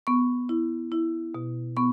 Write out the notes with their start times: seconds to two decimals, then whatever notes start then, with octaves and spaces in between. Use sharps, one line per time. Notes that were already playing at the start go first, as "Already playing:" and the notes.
0.07 B3 C#6
0.49 E4
0.92 E4
1.35 B2
1.77 B3 C#6